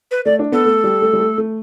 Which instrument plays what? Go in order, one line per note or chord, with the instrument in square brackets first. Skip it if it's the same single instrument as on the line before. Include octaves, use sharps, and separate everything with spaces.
[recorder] B4
[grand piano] A3 [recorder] D5
[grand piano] D4
[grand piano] B3 [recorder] A4
[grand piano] A3
G3
A3
G3
A3
A3